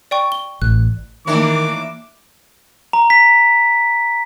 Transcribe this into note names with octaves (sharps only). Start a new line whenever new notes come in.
D5 G5 C#6
G7
A1 F#6
D#3 E3 A#3 D4 E4 C#5 D6
A#5
B6